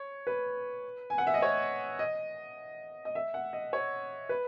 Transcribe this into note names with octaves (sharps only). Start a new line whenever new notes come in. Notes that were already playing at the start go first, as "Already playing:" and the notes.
Already playing: C#5
B4
G#5
F#5
E5
D#5
C#5
D#5
D#5
E5
F#5
D#5
C#5
B4